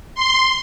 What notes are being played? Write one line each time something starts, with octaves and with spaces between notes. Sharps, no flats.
C6